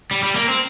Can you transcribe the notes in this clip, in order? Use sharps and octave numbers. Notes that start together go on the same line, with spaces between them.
G3
G3
A#3
C4